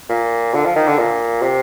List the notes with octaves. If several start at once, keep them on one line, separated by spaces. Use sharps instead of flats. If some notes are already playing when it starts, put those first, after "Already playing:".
A#2
D3
F3
D#3
D3
A#2
C3